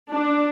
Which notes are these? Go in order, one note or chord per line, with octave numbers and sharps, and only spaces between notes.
D4